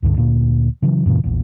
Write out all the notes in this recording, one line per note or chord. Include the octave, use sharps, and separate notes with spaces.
C#2 G2 D3
D2 A#2 A#3
C#3 E3 F#3
F#2 A#2 C#3 E3
E1 A#1